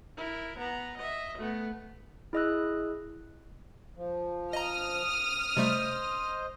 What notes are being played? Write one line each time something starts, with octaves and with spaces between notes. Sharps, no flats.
E4 A#4
B3 A#5
D#5 E5
A3 B3
E4 G#4 D#5 D#6 E6 F#6
F3
D#5 A#5 D#6 F6
C3 G3 A3 C5 D#5